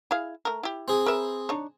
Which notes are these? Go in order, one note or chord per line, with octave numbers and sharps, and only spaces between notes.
E4 G#4 F5
A3 A#4
E4 G4
C4 G#4
A#4 B4 E5
D4 D#4 C#5